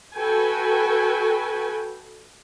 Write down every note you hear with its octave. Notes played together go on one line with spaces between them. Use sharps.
F#4 A4 B4 G5 G#5